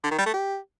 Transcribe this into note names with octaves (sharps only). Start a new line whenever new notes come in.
D3
D#3
G3
A3
G4